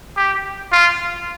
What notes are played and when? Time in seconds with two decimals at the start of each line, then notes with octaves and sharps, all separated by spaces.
0.17 G4
0.72 F4